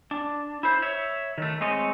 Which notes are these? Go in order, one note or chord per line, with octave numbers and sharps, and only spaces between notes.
D4
E4 C5
C#5 E5
D#3 A3
G#3 A3 C4 C#5 D#5